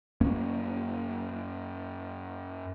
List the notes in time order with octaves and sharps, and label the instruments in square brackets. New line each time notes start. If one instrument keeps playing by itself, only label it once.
[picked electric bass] F#2 A#3 C#4